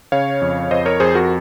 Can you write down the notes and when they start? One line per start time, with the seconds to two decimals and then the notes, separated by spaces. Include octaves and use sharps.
0.12 C#3 C#5 F5
0.41 F2
0.71 F2 C5 D#5
0.86 A#4 C#5
1.00 F2 G#4 C5
1.15 F#4 A#4